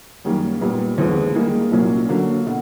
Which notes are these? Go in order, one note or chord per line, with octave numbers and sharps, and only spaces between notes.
F#2 D#3 G3 A#3 C#4
A#2 G3 B3
D#2 D3 F3 G#3 B3
D#3 G3 A#3 D#4 G#4
C2 A#2 F#3 A#3 C#4
D3 F#3 A#3
B2